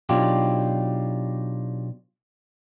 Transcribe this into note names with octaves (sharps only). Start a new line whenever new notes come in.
B2 F#3 D4 D#4 F4 G4